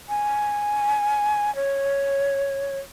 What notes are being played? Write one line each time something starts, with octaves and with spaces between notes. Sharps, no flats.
G#5
C#5